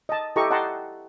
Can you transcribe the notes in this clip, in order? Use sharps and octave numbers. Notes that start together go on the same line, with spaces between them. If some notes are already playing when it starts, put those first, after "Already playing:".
D#5 A5
E4 G4 A4 D#5 A#5 C#6
D#5 F#5 G5 A5 A#5 C6